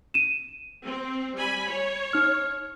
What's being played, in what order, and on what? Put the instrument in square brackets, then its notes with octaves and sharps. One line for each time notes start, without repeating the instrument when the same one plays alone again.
[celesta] D#7 E7
[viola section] C4
G3 G#5 B5
C#5
[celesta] D#4 F6